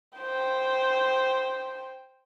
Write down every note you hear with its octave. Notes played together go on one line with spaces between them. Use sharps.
C5 G5